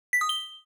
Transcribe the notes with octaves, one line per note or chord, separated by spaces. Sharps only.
B6
D#6
G7